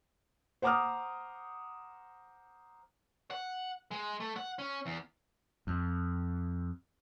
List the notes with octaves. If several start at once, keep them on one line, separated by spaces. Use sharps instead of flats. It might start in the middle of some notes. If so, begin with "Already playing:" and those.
C5 F#5 A#5 D6 D#6 F6
F#5
G#3
A3
F#5
C#4
E2
F2